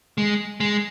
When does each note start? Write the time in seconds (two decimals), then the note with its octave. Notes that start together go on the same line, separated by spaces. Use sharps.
0.18 G#3
0.60 G#3